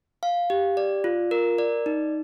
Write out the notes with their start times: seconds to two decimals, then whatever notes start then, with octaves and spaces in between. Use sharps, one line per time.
0.23 F5
0.50 G4
0.77 D5
1.04 F4
1.31 A#4
1.58 D5
1.86 D#4